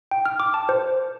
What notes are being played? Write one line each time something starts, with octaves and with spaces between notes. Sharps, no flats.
G5
F6
D6
A5
C5